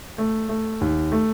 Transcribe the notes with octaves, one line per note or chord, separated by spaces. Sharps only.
A3
A3
D#2
A3